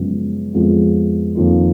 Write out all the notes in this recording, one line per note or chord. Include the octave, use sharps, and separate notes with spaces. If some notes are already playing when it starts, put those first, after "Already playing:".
Already playing: F#2 C#3 F3 G#3 B3
F2 F3 G#3 B3 F4
F2 D#3 A#3 F4